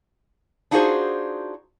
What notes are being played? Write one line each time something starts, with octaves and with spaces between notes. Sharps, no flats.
D4 D#4 F4 F#4 G#4 C5